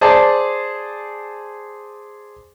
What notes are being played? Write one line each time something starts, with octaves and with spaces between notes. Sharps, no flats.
G#4 C5 D5 A5